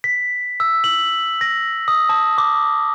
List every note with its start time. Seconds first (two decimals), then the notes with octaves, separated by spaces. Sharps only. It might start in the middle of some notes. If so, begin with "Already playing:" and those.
0.04 B6
0.60 E6
0.84 F#7
1.41 A#6
1.88 D#6
2.09 A5
2.38 D6